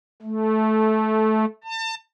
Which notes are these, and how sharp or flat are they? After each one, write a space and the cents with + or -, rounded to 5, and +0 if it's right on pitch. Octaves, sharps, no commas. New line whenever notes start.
A3 -15
A5 +35